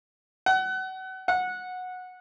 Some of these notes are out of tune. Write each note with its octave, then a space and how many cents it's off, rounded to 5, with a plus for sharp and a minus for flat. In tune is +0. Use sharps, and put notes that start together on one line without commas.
F#5 +30
F#5 -15